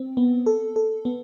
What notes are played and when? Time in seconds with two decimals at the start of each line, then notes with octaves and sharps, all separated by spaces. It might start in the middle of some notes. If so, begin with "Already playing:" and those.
Already playing: C4
0.17 B3
0.46 A4
0.76 A4
1.05 B3